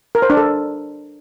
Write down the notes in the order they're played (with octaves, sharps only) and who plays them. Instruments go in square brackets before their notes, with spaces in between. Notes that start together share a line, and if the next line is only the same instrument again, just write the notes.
[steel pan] A#4
C5
D4
A4